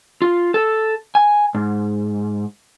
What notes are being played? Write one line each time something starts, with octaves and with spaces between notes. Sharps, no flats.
F4
A4
G#5
G#2